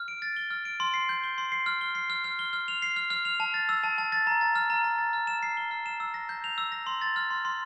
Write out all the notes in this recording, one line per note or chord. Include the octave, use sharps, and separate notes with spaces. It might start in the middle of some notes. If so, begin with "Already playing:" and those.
Already playing: F6
D7
A6
G7
F6
D7
C6
C7
G6
G7
C6
C7
F6
G7
C7
F6
F6
G7
F6
F7
C7
F6
F6
F7
A5
A6
E6
A5
A5
A6
A#5
A6
F6
A#5
A#5
A6
F6
E7
C7
G7
F6
E7
E6
A#6
G6
F7
E6
A#6
C6
A6
F6
C6
C6